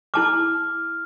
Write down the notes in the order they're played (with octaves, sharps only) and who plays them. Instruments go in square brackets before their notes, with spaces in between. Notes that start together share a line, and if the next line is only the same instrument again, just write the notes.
[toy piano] E4 A5 D6 [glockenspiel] F6